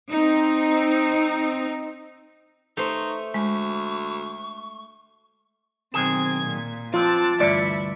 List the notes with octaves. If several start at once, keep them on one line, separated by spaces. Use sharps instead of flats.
C4 D#4
A3 D#4 C5 C#6
D2 G#3 C#6
B1 D#3 C4 G#4 G#6 E7
A#2
F3 C4 F4 A5 D6 F#6
D2 G2 E3 D5 E5 B5 C#7